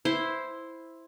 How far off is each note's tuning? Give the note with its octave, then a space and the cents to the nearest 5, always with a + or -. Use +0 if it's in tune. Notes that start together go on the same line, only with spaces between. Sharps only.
E4 +0 C5 +0